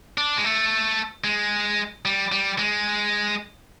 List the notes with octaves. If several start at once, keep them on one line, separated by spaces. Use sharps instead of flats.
D4
G#3
A3
G#3
G3
G3
G#3